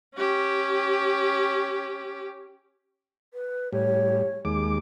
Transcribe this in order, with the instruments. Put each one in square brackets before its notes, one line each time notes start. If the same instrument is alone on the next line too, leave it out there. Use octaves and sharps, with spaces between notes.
[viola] C#4 G4
[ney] B4
[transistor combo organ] A2 G3 [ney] C#5
[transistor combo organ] D#2 G#3 D6